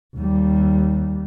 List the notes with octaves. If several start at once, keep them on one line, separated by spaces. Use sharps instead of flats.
D#2 G3